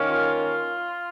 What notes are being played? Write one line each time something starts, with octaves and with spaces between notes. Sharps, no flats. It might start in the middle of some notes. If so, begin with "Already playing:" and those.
Already playing: D#3 A#3 C#4
F4